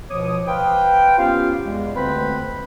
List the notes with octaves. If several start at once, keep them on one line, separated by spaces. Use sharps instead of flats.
C#2 B2 F3 C#5 D6 D#6
B4 C5 F5 G5
B3 C#4 F4 G4 F5
E2 G#3
D2 D3 C4 B4 C5 B5